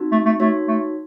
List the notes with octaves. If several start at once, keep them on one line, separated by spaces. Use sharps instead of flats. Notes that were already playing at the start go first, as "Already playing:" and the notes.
Already playing: C4 D#4 F#4
A3
A3
A3 D#4 F#4 C#5
A3